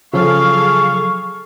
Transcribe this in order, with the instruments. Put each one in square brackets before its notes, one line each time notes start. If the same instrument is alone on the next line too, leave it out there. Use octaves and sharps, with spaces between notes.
[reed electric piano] C#3 F3 F#3 [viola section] G#4 A4 F5 [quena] C#6